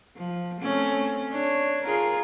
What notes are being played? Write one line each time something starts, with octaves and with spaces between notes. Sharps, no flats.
F3
A3 C4 C#4
D4 C#5
F4 G#4 A#4